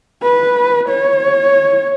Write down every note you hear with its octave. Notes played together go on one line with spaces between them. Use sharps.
B4
C#5